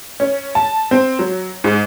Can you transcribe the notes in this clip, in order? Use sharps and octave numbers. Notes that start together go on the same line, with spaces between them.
C#4
A5
C4
F#3
G#2